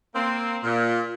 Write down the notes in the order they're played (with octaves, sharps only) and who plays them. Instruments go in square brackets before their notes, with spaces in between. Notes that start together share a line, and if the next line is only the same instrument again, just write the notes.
[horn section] A#3 C4
A#2